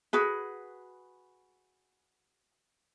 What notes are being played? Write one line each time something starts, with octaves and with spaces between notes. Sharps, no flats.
F#4 G#4 B4